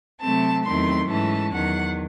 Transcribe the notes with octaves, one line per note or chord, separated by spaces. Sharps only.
C3 F#3 A3 C4 A5
E2 D#3 F#3 A3 C4 C6
G#2 E3 A3 C#4 A5
E2 D#3 F#3 F#5